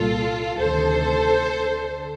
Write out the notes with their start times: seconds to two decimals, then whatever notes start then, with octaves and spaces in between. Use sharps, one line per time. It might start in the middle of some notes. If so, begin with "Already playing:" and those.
Already playing: C2 A#2 F4 A4
0.58 D2 C3 D#3 A4 C5
1.53 D2 D3